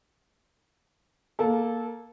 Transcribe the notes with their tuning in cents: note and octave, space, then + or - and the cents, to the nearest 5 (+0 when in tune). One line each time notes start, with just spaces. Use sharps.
A#3 +5 A4 -15